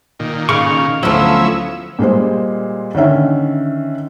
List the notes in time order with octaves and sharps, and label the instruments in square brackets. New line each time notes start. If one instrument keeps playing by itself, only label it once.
[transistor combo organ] A#2 D#3
[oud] C#3 [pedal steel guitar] F5 C#6
[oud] D2 F3 [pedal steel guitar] F#3 B3 F4 [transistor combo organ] C#4 E4 E5
[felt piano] A#2 G3 G#3 C5
D3 D#3 C#4 E5